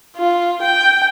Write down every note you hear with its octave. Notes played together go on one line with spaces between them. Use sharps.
F4
G5